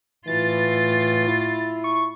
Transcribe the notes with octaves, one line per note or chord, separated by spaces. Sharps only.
A2 E3 F4 A6
E4
C#6